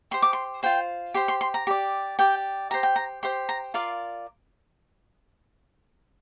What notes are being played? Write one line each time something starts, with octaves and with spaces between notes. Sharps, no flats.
G4 C5 C6
D6
C6
F4 C5 G5
G4 C5 C6
C6
C6
A#5
G4 D5
G4 D5 G5
G4 C5 A#5
G5
A#5
G4 C5 C6
A#5
F4 A#4 D5 F5